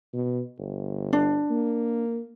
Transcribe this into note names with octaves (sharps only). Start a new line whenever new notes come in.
B2
G1
D4
A#3